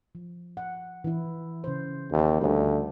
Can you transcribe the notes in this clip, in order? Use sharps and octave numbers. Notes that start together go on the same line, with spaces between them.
F3
F#5
E3 E4
C#3 C5
D#2
D2 G3 D4